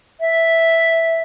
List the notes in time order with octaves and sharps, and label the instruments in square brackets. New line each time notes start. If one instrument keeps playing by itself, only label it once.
[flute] E5